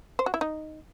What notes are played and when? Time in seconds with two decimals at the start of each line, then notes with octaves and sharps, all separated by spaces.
0.19 C5
0.26 F#4
0.34 E4
0.41 D#4